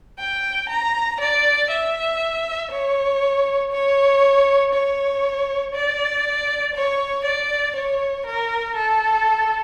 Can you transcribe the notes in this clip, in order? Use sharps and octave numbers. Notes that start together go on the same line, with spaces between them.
G5
A#5
D5
E5
C#5
C#5
C#5
D5
C#5
D5
C#5
A#4
A4